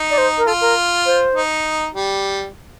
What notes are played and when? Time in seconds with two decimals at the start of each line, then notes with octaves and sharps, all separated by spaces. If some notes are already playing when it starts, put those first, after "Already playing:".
Already playing: D#4
0.11 D5
0.18 C5
0.38 A#4
0.47 F4 A4
0.61 A#4
1.06 C5
1.35 D#4
1.94 G3